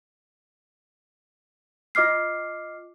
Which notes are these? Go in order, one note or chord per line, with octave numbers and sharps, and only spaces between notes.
F4 D#5 D6 F6 C7